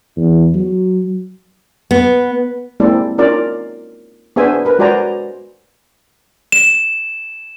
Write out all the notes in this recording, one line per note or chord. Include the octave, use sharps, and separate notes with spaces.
E2
F#3
B3
G#3 A#3 C4 E4 A4 D5
C#4 D#4 F4 A#4 D5
B3 D4 G#4 C5 E5 G#5
A#4 B4
G#3 F#4 C5 D5 G#5 A#5
E7